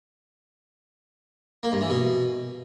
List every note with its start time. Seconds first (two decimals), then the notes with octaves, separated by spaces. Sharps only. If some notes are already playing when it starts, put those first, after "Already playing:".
1.63 A#3
1.72 G2
1.81 E3
1.90 B2